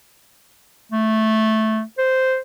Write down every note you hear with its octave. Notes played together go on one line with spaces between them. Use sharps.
A3
C5